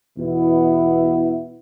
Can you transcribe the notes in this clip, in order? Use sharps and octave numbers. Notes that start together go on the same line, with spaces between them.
E2 B2 B3 E4